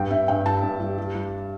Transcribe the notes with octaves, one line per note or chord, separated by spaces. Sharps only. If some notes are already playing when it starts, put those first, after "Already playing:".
Already playing: G2 G3 G5
G2 E5
G2 G5
G3 A5
G2
G3
G3
G3